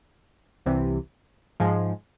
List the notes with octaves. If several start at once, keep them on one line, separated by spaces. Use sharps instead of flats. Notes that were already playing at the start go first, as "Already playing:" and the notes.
C2 C3 E3
G#2 F3 G#3